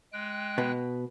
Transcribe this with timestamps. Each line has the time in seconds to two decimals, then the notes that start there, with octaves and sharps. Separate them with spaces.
0.13 G#3 G5 F#6
0.58 B2 B3